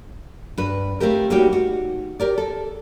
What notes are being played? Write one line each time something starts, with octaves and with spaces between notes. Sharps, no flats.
G2 B4
A3 C4 F4 G4 A#4
G3 A#3 C#4 D#4 F#4 G4
D#4 F#4
G4 A#4 D5
A4